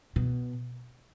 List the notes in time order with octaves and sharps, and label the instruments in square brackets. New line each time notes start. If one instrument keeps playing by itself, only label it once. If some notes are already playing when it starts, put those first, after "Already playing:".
[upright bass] B2